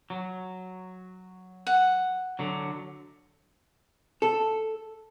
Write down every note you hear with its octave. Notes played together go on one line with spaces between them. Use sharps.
F#3
F#5
D3 F#3
A4